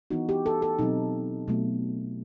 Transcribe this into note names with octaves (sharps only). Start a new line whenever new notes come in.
E3 B3 D#4 F#4
G4
A4
A4
B2 F#3 C4 D#4
B2 F#3 A3